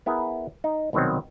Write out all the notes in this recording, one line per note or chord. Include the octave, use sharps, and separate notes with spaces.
B3 E4 G#4 A#4
D#4
C2 B2 D#3 F#3 C4